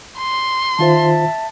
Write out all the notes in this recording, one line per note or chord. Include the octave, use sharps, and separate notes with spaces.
C6
D#3 F4 C5 E5 A5